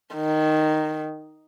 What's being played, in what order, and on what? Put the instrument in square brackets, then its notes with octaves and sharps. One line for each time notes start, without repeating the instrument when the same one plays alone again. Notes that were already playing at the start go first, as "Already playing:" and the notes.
[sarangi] D#3